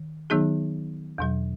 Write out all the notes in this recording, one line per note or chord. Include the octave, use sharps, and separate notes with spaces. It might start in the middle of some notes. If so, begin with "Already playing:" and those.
Already playing: D#3
D#3 F#3 B3 D#4 G#4
E2 B2 F#3